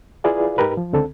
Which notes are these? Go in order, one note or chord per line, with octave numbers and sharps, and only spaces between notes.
E4 F4 G#4 B4 D5 F5
G#2 D#4 G4 A#4 B4
F3
C#2 D3 C4 A4